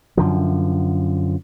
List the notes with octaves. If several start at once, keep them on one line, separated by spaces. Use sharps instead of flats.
F#2 D3 F3